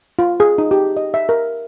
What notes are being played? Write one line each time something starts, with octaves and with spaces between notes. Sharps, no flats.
F4
G#4
D#4
G4
D#5
E5
A#4